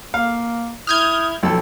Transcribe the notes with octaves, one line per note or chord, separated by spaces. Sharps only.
A#3 F5
E4 D#6 F6 G6 G#6
B1 F2 A4 E6